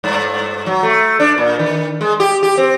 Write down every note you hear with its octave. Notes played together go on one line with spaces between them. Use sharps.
G2
F#3
A3
D4
A#2
D#3
G#3
G4
G4
C4